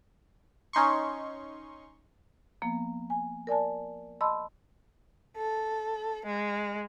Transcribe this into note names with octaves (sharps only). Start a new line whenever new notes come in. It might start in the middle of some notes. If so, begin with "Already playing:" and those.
C#4 D#4 C6 C#6
F3 A#3 B3
G#5
A#4 D5 G#5 A5
D#5 A5 B5 C6 E6
A4
G#3